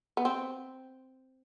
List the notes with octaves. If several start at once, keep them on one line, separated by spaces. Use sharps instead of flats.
B3
C4